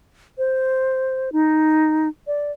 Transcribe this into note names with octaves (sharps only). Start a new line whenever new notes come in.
C5
D#4
D5